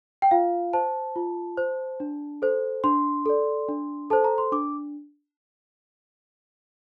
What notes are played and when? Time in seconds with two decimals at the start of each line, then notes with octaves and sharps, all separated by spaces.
0.22 G5
0.31 F4 F5
0.73 C5 A5
1.16 F4
1.57 C5
2.00 D4
2.42 A4 C5
2.84 D4 C6
3.26 A4 D5
3.69 D4
4.10 A4 C5 A5
4.24 A#5
4.38 C6
4.52 D4 D6